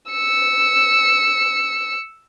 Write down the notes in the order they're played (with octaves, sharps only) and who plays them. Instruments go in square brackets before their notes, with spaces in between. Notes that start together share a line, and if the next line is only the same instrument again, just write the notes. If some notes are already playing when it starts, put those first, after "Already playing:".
[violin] E6 C#7